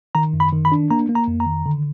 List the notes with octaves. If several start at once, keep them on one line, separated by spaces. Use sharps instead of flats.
D#3 A#5
F#2
B5
D#3
B5
D4
A#3 A#5
A#3
A#5
F2
A#5
D#3
D3